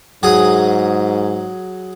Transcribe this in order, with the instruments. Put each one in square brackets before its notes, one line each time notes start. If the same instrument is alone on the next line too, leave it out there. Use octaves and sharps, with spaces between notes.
[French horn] G#2 [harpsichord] F#3 G#4 D#6